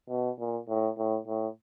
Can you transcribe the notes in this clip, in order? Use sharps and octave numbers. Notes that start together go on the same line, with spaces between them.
B2
A#2
A2
A2
A2